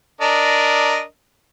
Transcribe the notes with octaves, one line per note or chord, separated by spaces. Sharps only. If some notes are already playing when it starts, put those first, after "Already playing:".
D4 A#4 D#5